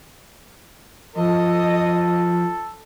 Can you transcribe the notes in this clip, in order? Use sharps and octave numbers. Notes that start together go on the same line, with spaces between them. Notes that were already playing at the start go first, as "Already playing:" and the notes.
F3 A4 D#5